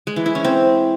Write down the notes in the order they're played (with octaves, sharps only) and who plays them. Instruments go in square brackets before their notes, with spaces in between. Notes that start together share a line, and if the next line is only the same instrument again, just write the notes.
[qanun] G#3
E3
E4
C#4
C4